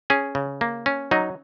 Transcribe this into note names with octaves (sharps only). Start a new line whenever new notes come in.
C#4 G#4
C#3
A#3
C#4
F#3 D#4